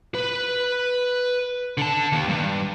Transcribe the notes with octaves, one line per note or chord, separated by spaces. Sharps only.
B4
D3 A5
D#2
G2